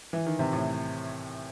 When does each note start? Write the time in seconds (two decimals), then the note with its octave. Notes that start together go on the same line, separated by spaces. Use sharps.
0.13 E3
0.27 D#3
0.39 C3
0.53 A2